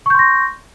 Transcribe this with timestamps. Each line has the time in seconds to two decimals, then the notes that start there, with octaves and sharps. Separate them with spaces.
0.06 C#6
0.10 G6
0.15 C6
0.19 A#6